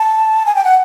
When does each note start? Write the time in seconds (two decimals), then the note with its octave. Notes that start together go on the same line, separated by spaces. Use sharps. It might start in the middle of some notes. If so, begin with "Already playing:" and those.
Already playing: A5
0.46 G#5
0.55 G5
0.64 F#5